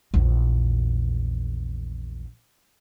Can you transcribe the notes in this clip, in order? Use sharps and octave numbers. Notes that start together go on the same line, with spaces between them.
A#1 E2